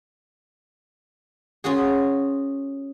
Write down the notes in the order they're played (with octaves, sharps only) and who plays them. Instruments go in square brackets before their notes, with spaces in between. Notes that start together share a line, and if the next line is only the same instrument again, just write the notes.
[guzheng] C#4 F4 F#4 G#4